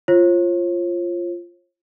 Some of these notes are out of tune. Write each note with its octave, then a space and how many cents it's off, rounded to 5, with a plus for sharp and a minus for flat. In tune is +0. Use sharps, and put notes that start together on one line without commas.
F4 -10 C#5 -45